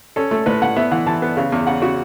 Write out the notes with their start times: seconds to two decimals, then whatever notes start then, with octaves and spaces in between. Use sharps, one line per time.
0.16 C#4 A4
0.31 A3
0.46 A2 B4
0.62 A2 F#5
0.76 B3 E5
0.91 E3 F#5
1.06 E3 A5
1.22 B3
1.37 C#3
1.52 E2
1.67 C#3 F#5
1.82 C#3 F#4